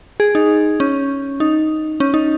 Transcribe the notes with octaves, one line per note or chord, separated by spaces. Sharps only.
G#4
D#4
C#4
D#4
C#4
D#4